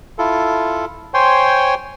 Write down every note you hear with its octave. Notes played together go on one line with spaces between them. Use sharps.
E4 F4 A4
C5 C#5 G5 G#5 C6